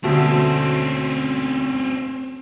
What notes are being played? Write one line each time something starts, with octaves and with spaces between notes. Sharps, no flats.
D2 B2 A3 C4 C#4